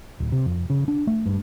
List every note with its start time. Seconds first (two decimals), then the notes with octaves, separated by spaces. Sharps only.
0.20 D1
0.32 C3
0.46 F2
0.70 C#3
0.88 D4
1.07 A3
1.26 G2